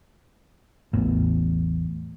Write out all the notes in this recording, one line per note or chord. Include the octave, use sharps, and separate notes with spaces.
A1 E2